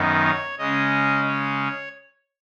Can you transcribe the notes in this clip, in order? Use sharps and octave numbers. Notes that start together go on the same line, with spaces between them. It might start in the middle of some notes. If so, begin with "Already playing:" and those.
Already playing: F#2 D#3 B3 D#4
C#5
C#3 G#3 C#4 D#5
C#5